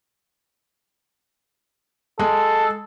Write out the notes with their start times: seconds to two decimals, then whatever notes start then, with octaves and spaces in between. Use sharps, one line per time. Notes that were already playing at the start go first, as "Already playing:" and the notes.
2.19 G#3 A4